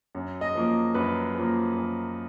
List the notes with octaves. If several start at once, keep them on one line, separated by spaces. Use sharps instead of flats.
F#2
D#5
F3 A#3
F#2 B4
F3 A#3
F#2